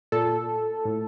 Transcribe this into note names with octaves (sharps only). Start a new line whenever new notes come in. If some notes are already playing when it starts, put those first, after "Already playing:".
A#2 A4
A2